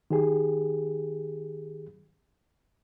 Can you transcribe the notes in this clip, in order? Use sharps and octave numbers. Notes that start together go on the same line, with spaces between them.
D#3 G4 G#4